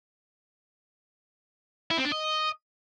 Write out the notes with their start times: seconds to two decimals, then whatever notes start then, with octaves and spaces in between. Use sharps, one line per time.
1.91 E4
1.98 C4
2.05 D4
2.12 D#5